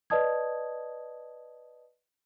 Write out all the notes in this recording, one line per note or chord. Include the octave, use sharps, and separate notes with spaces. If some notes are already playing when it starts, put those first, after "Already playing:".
B4 D5 D#5 A5 D#6 G#6